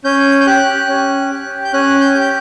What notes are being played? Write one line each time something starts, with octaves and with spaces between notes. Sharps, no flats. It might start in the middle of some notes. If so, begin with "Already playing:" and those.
C#4 G6
G6
G4 F#6
C#4
G4
G6
C#4 F#6
G6
G4
G6